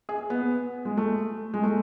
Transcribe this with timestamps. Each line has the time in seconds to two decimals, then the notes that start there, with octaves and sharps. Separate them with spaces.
0.09 G#4
0.30 B3
0.85 G#3
0.97 A3
1.54 G#3
1.63 A3